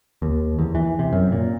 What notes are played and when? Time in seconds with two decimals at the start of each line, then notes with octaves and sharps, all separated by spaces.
0.22 D#2
0.59 E2
0.75 E3
0.99 C3
1.13 F#2
1.32 A#2